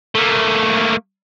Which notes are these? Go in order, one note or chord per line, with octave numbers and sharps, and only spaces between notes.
A3 A#3